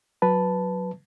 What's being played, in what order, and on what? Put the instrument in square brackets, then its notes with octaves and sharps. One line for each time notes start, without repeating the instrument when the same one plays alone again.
[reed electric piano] F#3 B4 A5